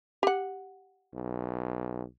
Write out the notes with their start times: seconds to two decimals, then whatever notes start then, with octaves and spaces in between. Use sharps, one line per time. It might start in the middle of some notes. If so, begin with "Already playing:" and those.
0.23 G4 F#5
1.14 B1